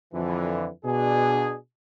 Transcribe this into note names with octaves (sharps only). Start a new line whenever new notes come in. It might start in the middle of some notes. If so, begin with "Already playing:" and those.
F2 D3 E3
B2 D4 G#4